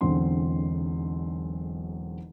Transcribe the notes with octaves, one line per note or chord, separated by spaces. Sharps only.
E1 B1 E2 D3 C4 C6